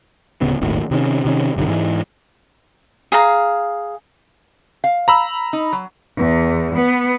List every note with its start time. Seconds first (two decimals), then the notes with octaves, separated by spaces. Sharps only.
0.41 D1 C#3 B3
0.61 D#1 G#1 D#2 A2
0.91 C3 D#3 A3 C#4
1.25 C3 D#3 C#4
1.56 G1 C2 G2 D#3
1.68 G#2 E3 G#3
3.12 G#4 F5 A#5
4.84 F5
5.08 A#5 B5 E6
5.53 D#4
5.73 F#3
6.17 E2
6.74 B3